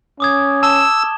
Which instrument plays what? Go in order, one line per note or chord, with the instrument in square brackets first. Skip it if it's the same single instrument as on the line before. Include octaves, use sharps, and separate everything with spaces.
[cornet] C#4 [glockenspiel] D6 D#6 G#6
[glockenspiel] A5 E7 G7 [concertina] E6